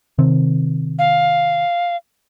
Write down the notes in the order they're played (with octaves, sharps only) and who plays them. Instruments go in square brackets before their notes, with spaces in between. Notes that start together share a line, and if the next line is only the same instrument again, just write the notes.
[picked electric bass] C3 D#3 C4
[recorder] F5